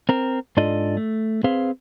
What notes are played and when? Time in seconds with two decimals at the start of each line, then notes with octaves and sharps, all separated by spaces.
0.09 C4 A#4
0.57 G#2 D4 F4 A4 D5 D#5
0.97 A3
1.44 C4 G#4 B4 C5 F5